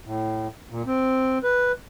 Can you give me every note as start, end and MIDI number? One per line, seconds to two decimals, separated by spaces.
0.05 0.48 45
0.70 0.83 46
0.87 1.38 60
1.44 1.72 71